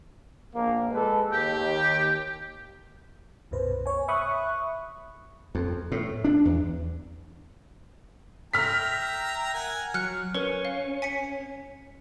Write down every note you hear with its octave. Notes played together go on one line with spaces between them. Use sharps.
A#1 A#3
G#3 A4 B4
D#2 G4
C2 F#2 B2 B4 C5
C#5 G#5
E5 B5 C#6 D#6 F#6
F2
A2
D4
E2
E5 G5 A#5 F6 B6
A#4 F#5 G#5
F#3 F6 F#6 C#7
C#4 A#4 B4
F5
G#5 B6 C#7